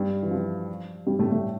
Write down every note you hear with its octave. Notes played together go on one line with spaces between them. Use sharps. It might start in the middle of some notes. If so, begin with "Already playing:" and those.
Already playing: G2 G3
E3
F3
G2 G3
A2 A3
A2 A3